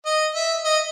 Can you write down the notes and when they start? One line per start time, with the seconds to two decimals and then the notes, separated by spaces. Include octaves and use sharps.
0.06 D#5
0.35 E5
0.65 D#5